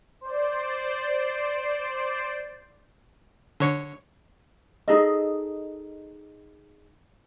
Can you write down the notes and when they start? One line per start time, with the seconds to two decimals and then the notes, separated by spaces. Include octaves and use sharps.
0.21 C5 D5
3.60 D3 C#5 C#7
4.88 D#4 G#4 A4 D#5